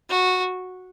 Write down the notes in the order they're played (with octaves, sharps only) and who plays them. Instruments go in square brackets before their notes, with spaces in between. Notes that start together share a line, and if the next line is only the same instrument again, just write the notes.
[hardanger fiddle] F#4